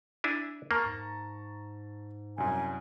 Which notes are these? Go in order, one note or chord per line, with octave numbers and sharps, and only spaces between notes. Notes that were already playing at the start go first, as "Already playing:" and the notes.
D4 E4 G#5
E2 A#3 A5 A#5 C#6
G#2
C2 F#2 G#5